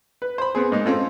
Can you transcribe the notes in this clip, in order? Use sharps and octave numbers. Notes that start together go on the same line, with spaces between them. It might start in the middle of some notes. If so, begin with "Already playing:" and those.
B4
C5 B5
B3 C4 G#4
G#2 A#3 D#4
C4 C#4 F4 A4